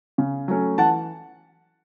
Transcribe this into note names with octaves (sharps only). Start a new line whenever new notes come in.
C#3
F#3 A3 C#4
E3 F#5 A5